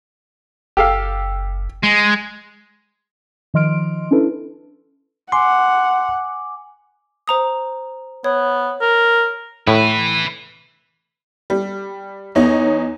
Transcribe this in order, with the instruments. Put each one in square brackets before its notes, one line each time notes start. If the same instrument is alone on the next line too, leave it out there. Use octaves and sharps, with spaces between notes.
[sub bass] F#1 [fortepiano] G4 A4 F5
[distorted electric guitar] G#3
[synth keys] D#3 F3 D#5 C6 F6 D7
C#4 D4 E4 A4 B4
[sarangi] F#5 [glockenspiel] G#5 D6 [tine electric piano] C6
[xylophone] C5 A#5 D#6
[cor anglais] B3 [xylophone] C#5
[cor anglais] A#4
[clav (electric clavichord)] A2 [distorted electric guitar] B4 E5
[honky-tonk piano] G3
E2 B3 D#4 C#5